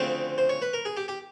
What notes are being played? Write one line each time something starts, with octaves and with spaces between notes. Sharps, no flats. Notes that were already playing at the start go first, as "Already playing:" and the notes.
Already playing: D2 C#3 F3 A3 C4 C5
C5
C#5
B4
A#4
G#4
G4
G4